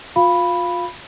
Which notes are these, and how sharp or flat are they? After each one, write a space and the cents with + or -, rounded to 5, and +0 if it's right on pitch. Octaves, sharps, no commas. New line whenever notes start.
F4 +30 F5 -10 B5 +0